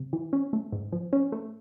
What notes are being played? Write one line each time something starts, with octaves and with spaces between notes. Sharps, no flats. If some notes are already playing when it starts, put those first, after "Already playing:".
Already playing: C3
E3
C#4
A3
G#2
F3
C#4
A3